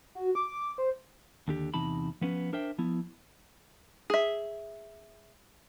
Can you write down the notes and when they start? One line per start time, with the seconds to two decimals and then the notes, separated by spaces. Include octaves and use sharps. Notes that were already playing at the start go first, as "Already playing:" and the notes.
0.15 F#4
0.35 D6
0.78 C5
1.48 D#2 D3 G4
1.74 E2 C3 E3 D#4 A5 B5
2.21 F3 B3 C#4 B4
2.53 D4 A#4 C5 E5 G5
2.78 F3 B3 E4
4.10 G#4 E5